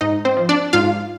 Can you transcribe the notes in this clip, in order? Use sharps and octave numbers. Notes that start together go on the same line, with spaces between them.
G#2 D#4 D#5
C4 C5
F3
D4 D5
G#2 F4 F5